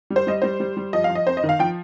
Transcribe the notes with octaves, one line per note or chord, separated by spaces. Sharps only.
G3
C5
G3 D#5
G3 C5
G3
G3
F3 D#5
F5
F3
D#5
F2 C5
D#5
D#3
F5
F3 G5